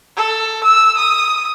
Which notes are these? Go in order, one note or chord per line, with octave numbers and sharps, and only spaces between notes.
A4
E6
D#6